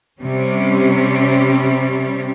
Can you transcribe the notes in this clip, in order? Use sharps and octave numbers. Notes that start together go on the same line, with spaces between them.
C3 G3 C#4